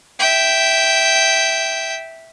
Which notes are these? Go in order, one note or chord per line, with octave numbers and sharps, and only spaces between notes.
E5 G5